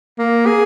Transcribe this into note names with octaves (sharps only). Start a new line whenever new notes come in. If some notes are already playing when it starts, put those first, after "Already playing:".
A#3
G#4